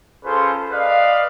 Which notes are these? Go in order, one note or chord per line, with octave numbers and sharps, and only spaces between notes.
C#4 F4 G#4 A4 B4 C5
B4 D5 D#5 F5